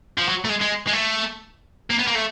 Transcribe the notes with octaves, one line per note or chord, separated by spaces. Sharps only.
F3
F#3
A3
G#3
G#3
G#3
A3
A#3
B3
A#3
A3